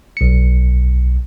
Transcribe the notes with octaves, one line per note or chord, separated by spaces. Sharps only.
B1 C#7